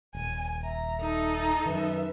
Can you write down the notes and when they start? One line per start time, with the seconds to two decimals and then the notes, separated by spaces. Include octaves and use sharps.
0.15 D#1 G#5
0.63 E5 A#5
1.01 D#4 A4
1.34 A#5
1.66 F#2 D#3 B4 E5